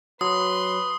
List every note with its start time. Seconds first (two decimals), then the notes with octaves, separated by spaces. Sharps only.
0.21 F#3 B4 C6 D#6